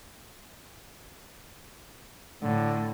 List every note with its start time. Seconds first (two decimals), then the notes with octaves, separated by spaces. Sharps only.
2.42 A2 D3